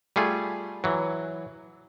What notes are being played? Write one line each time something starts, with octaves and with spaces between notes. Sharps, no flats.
G3 A3 F4 G#4
E3 F#3